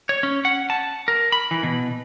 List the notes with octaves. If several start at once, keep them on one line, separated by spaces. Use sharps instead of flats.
C#5
C#4
F#5
A5
A#4
B5
E3
B2